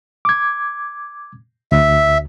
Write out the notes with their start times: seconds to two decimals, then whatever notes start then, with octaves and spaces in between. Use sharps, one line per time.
0.25 D6 G#6
1.72 D2 E5